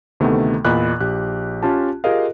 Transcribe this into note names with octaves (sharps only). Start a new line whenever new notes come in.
D2 C3 D#3 A3 B3
E2 A#2 D#5 B5 F#6
A#1 G4 F#6
C#4 F4 G4 A5
F4 G4 G#4 A#4 D#5 F5